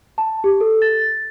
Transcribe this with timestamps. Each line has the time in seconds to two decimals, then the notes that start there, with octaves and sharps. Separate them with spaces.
0.18 A5
0.44 G4
0.61 A4
0.82 A6